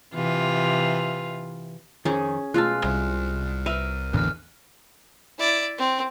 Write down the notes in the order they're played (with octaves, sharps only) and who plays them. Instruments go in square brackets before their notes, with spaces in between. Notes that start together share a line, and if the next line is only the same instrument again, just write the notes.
[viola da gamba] C3 E3 F4
[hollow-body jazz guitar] F2 D#3 [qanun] C#4 G#4
[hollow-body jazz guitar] B1 A3 A5 [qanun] G#3 F4 [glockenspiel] F6 F#6
[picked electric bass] C2 [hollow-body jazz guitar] C3
[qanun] A#4 [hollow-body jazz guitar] B4 E5 [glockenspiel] F6 D#7
[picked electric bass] A1 E2 D3 [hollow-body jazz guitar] A#2 [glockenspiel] F6 F#6
[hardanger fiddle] E4 D5
C4